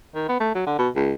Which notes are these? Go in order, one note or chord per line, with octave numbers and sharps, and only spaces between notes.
D#3
B3
A3
F#3
D3
B2
C#2